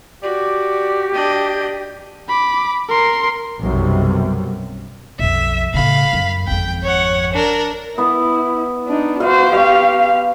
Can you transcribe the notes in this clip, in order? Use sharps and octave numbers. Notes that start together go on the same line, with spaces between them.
F#4 G4 D5
D4 D#5 G5
B5 D6
A#4 C6
B1 F#2 C3 G3
B1 F2 E5
A2 C#3 F5 B5
F#2
G#1 F2 G5
C#5 F#5
D4 A#4
B3 E4
D4 D#4
F#4 C5 F5
G4 F5 G5 C#6